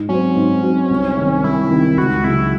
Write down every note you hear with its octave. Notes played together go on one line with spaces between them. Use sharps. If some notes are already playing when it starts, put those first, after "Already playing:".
Already playing: G#2
F#3 C4 C#4
G#2
F#3 C4
C2
C3 D#3
C2 E4
C3 D#3
C#2 F#4
C#3 F#3 E4